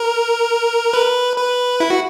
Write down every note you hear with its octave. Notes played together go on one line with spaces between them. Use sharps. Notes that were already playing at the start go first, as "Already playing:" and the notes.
Already playing: A#4
B4
B4
E4
F#4